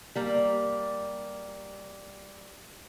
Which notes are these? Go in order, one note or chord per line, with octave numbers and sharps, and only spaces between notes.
G3 A#3